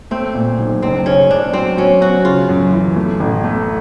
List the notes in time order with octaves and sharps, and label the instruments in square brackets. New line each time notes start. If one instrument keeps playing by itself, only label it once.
[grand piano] A3 [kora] C4
[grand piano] A#2
B1
[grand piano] F#1 [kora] C4
[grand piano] C#3 [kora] C#4
[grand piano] F#1 [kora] D4
[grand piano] F#3 [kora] C4
[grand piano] F#3 [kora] C#4
[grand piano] F#3 [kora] F#4
[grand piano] C#3 [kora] F4
[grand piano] F#2
E3
A3
A1
A3